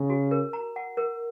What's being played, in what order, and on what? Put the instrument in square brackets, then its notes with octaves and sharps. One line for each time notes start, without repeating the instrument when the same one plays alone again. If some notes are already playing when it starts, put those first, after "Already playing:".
Already playing: [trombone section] C#3
[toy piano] F#4
A#4
A#5
F#5
A#4